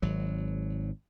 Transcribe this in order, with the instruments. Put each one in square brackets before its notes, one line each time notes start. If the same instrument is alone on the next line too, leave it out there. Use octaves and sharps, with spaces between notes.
[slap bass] G#1 F#3